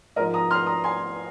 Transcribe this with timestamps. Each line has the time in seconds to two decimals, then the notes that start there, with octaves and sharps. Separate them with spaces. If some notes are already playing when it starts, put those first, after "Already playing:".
0.16 G#2 A#4 D#5
0.19 F3
0.34 A#5 D#6
0.51 C6 F6
0.66 A#5 D#6
0.84 G#5 C6